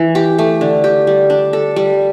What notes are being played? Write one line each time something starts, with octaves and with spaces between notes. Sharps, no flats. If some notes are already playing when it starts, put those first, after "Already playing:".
Already playing: E3
G4
A3
D3
G4
G3
D4
A4
G3